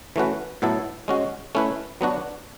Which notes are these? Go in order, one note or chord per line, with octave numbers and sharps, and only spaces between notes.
E3 A3 C#4 F#4 B4
A2 F#3 B3 E4 A4
G#3 C#4 F#4
A3 C#4 E4 B4
F#3 B3 D4 F#4